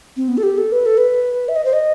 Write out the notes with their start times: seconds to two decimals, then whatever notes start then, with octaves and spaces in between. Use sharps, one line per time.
0.17 C4
0.28 B3
0.37 A4
0.43 G4
0.58 A4
0.72 B4
0.86 A4
0.97 B4
1.48 E5
1.56 D#5
1.65 C5
1.73 D#5